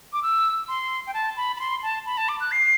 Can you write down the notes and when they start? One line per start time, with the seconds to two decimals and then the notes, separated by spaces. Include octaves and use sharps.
0.13 D6
0.23 E6
0.68 C6
1.07 G5
1.14 A5
1.37 B5
1.56 B5
1.60 C6
1.83 A5
2.06 B5
2.17 A5
2.28 D6
2.40 F#6
2.51 C7